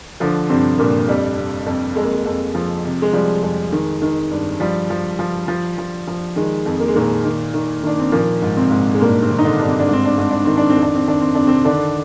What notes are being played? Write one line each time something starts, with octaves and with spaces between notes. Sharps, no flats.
D3 F3 D4
G2 C3 C4
G2 A#2 A#3
F2 G3
C3
F2
F2 G#3
A#3
G#3
F2
F3
C3
G#3
F3 G3
F2 G#3
D#3
D#3
G2
F3 G3
F3
F3
F3
F3
F3
D#3 G#3
F2
A#3
G#3
A#2 D#3 A#3
D#3
D#3
D#3 D4
C4
A#2 F3 A#3
G#2
C3 C4
G#2
G#3
G2 A#2 A#3
C3 C4
D#3
D#4
D3 D4
G2
C4
D4
G#2 C4
D4
G#2 C4
D4
D#3 C4
D4
C4
F2
D4
C4
D#3 D4
C4
F2 D4
C3 C4
D3 D#3 D4